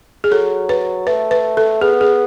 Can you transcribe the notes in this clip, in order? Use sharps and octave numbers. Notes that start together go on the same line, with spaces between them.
G#4
F#3 A4
B4
A3 B4
B4
A4
B3 G#4
G#4